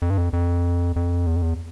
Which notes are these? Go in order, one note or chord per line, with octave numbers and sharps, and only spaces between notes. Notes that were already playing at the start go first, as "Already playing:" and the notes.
F2
G2
F2
F2
F2
E2
F2
E2